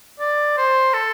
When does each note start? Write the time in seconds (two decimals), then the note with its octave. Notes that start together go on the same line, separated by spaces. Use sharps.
0.20 D5
0.58 C5
0.94 A4